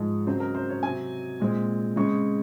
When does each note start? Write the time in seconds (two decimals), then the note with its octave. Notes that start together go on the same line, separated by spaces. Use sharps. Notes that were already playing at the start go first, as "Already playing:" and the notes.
Already playing: G#2 F3 G#3
0.26 C#3 F#3 C4 C5
0.40 A#4
0.55 C5
0.69 C#5
0.83 C3 F#3 C4 G#5
1.40 A#2 G#3 C4
1.96 C#3 G#3 C4 C#6